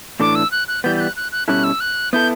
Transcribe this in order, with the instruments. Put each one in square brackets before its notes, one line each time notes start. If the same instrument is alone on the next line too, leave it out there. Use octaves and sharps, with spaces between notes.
[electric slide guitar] A2 E3 A3 D4 A4 [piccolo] D6
[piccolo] E6
F#6
F#6
[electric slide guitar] E3 G3 B3 [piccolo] G6
[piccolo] G6
F#6
F#6
F#6
[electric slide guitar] B2 G3 C#4 E4 A4 [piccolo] F#6
[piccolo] E6
F#6
[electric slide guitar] B3 E4 A4 [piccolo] G6